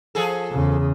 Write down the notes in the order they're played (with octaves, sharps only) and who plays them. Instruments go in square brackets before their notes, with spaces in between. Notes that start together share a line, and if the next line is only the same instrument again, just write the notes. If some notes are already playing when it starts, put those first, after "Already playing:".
[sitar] F3 G#4 A4
[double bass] E2 C#3